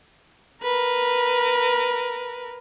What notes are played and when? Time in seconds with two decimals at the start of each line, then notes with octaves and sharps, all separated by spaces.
0.63 A#4 B4